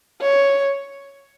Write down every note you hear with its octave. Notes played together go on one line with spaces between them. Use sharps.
C#5